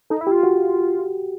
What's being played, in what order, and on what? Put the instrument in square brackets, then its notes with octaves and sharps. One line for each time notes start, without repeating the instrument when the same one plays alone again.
[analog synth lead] D#4 [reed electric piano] A4
[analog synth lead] E4
[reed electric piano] G4
[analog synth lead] F4
[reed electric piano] F#4